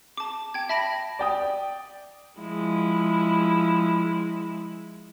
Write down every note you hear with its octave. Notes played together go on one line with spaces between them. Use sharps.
A5 D6
G5 G#6
E5 A5 B5 A#6 D7
D5 G5 D#6
F3 G#3 E4